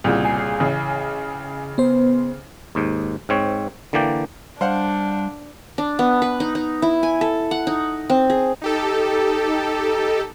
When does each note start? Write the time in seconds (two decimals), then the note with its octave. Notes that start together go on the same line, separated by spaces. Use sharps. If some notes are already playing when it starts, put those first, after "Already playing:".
0.04 C2 A#2 C#3
0.25 G#5 C7
0.60 A1 C#3
1.78 B3 C5
2.75 D#2 G#2
3.29 G#2 C4 C#5
3.93 D3 E3 A#3 D5 G5
4.61 G3 D4 C5 F5 F#5
5.78 D4
5.99 B3
6.22 B4
6.40 D#4
6.55 D#4
6.82 E4
7.03 G#5
7.21 A4
7.51 F#5
7.67 D#4
8.10 C4
8.30 G#4
8.62 D#4 G4 A4